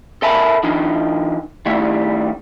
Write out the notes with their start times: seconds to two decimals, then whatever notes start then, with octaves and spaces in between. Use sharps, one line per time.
0.22 A4 A#4 E5 G#5 A5 B5
0.63 E3 D4 D#4 F4
1.66 D#3 G3 A3 E4